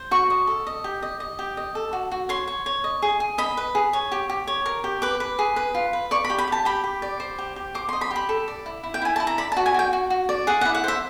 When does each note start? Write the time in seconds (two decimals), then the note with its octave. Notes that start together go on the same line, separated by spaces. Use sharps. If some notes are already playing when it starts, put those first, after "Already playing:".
Already playing: C5
0.11 F#4 C#6
0.30 D#5
0.47 A4
0.67 D#5
0.84 G4
1.02 D#5
1.20 D#5
1.39 G4
1.57 D#5
1.75 A4
1.93 F#4
2.11 F#4
2.29 C#5 C6
2.48 C#5
2.66 C#5
2.84 D#5
3.02 G#4
3.20 G#4
3.38 D#5 B5
3.57 B4
3.75 G#4
3.93 C#5
4.12 G4
4.29 G4
4.47 C#5
4.66 A#4
4.84 G4
5.02 B4 D6
5.20 B4
5.39 G#4
5.56 B4
5.74 F4
5.93 B4
6.11 D5 C#6
6.24 B5
6.30 G4
6.38 B5
6.47 G4 A5
6.65 G4 B5
6.84 G4
7.02 D5
7.20 C5
7.38 G4
7.56 G4
7.75 C5 D6
7.89 D#5 C6
8.01 B5
8.11 G4
8.16 B5
8.29 A4
8.48 D5
8.66 E4
8.83 E4
8.94 G5
9.02 E4 G#5
9.16 E4 A5
9.27 A#5
9.38 D5 B5
9.52 A5
9.57 F#4
9.66 G#5
9.74 F#4 G5
9.93 F#4
10.10 F#4
10.29 D5
10.47 G#4 F#5
10.61 E4 F#5
10.75 F#5
10.84 C5 E5